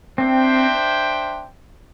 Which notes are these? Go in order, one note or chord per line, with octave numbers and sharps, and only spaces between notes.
C4 D4 C5 E5 G5